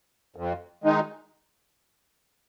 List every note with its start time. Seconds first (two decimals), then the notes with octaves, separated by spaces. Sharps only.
0.36 F2
0.84 D#3 G#3 D#4